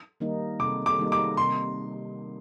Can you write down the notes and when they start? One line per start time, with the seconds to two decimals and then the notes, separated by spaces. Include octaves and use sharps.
0.20 D#3 G3 A#3 D#4
0.60 C3 D6
0.86 D6
0.98 D#3 G3 A#3 D#4
1.12 D6
1.37 C3 C6